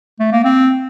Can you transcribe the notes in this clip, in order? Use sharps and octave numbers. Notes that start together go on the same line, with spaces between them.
A3
A#3
C4